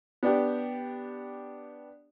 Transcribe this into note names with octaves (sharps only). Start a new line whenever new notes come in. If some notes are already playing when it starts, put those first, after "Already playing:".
B3 D4 G4